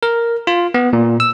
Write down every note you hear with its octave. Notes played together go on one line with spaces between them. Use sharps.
A#4
F4
B3
A#2
E6